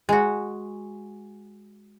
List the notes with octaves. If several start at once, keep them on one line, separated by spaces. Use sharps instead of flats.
G#3 F#4